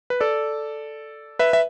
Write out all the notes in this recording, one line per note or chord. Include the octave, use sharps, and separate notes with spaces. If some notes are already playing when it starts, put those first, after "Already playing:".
B4
A4 D5
B4 E5
E5